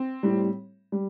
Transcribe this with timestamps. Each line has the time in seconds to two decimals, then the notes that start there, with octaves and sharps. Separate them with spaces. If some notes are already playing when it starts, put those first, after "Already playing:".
Already playing: C4
0.23 A2 G3
0.92 G3